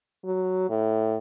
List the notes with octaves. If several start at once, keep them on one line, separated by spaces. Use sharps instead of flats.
F#3
A2